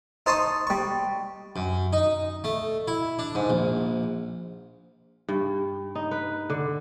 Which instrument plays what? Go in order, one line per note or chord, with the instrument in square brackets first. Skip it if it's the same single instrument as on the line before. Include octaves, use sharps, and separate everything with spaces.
[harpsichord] D#4 C5 A5 C6 C#6 D#6
G3 C#6
F#2
D#4
A3
E4
D4
G#2
A#1
[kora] G2
D#4
B4
D3